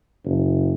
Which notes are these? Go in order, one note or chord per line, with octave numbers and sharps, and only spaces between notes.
F#1